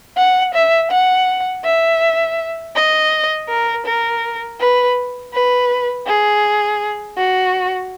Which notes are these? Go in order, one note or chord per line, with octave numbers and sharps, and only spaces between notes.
F#5
E5
F#5
E5
D#5
A#4
A#4
B4
B4
G#4
F#4